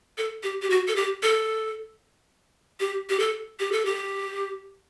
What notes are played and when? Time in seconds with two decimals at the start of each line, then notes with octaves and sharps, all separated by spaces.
0.18 A4
0.43 G4
0.62 G4
0.70 F#4
0.88 A4
0.96 G4
1.23 A4
2.80 G4
3.09 G4
3.19 A4
3.59 G4
3.72 A4
3.85 G4